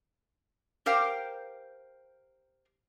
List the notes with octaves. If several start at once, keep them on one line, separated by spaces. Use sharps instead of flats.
G4 A#4 C5 F5 G5